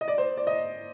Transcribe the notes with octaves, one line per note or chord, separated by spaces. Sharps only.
D#5
D5
C5
D5
D#5